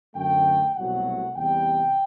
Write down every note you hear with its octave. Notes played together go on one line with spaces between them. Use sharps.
F#2 D3 A3 G5
C2 B2 F#3 A3 F#5
E2 C3 G3 G5